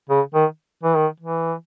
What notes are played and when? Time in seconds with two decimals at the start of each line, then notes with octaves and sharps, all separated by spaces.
0.10 C#3
0.34 D#3
0.83 E3
0.95 D#3
1.20 E3